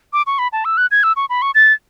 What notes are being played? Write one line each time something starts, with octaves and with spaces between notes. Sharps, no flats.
D6
C#6
B5
A5
E6
F#6
G#6
E6
C#6
B5
C#6
A6